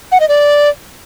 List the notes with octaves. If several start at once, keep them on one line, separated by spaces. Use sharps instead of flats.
F#5
D#5
D5